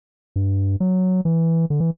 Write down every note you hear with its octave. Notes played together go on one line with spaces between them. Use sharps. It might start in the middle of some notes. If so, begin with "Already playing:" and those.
G2
F#3
E3
D3
E3